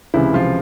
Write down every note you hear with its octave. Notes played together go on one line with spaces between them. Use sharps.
C#2 C3 E3 E4
F3 F4